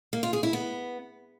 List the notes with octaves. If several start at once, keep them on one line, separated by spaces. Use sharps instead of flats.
A#3
F4
G#4
E4
B3